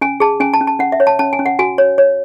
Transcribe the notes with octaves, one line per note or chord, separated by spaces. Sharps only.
C#4 G#5
G#4 A5
C#4 G#5
A5
C#4
A5
C#4 F#5
E5
C#5
A5
C#4 A5
G#5
C#4
F#5
F#4 G#5
C#5
C#5